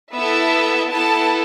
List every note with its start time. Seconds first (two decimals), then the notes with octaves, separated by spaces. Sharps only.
0.14 B3 E4 A4 E5
0.90 B3 E4 A4 A5